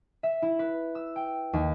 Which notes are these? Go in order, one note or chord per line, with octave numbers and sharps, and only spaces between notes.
E5
E4
B4
E6
G5
D#2